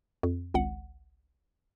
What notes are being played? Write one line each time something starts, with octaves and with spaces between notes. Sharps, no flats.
F2
G#1 C#2 F#5